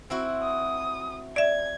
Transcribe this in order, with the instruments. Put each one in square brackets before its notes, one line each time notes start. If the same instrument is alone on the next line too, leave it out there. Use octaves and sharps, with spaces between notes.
[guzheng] C4 E4 F#4
[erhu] D#6
[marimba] D5 E5 [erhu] G#6